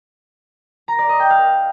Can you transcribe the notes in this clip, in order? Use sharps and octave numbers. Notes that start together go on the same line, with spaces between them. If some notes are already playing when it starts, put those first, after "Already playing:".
A#5
D5
D#5
G5
F5